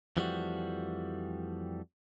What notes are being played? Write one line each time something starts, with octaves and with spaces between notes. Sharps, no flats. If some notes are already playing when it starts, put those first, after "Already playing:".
F2 E3 F3 G3 A3 F#4